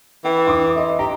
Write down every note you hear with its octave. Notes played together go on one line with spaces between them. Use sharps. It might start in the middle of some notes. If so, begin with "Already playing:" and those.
E3 G5
C6 D6 D#6
D#5 E5
G4 A#5